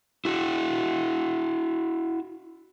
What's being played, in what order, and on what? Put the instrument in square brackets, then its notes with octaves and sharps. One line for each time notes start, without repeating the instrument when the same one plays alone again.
[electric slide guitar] E4 F#4